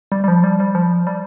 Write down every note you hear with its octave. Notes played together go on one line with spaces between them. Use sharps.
G3
G3
F3
G3
G3
F3
G3